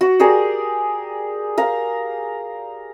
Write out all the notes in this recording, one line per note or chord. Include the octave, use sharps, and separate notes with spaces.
F#4
G4 G#4 A#4 D5
A#4 F5